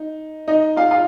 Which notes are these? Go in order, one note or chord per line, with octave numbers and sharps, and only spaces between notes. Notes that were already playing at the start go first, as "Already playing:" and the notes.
Already playing: D#4
D#4 D#5
F4 F5
F4 F5